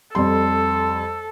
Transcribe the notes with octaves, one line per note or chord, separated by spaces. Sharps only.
F2 G3 A4 C6